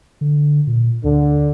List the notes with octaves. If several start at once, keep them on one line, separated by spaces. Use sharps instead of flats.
D3
A#2
D2 D3